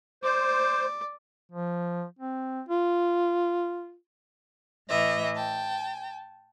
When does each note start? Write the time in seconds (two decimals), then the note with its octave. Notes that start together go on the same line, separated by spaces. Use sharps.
0.23 C5 D5
1.52 F3
2.19 C4
2.69 F4
4.89 A2 E3 D#5 E5
5.35 G5 A5